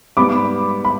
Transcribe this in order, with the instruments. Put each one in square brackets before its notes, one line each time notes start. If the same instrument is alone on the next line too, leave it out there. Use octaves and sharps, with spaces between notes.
[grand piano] G#2 G3 B3 [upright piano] B5 D6
[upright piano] B5